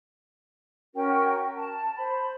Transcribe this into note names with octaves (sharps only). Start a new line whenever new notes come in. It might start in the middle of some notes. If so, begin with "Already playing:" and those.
C#4 F#4 A#4 G5
A5
C5 B5